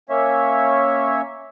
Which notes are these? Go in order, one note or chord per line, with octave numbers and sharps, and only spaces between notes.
A#3 C#4 C#5 E5